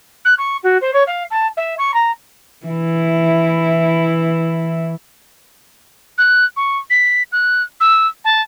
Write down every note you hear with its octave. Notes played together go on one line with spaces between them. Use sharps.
F#6
C#6
F#4
C5
C#5
F5
A5
E5
C#6
A#5
E3 E4
F#6
C#6
B6
F#6
E6
A5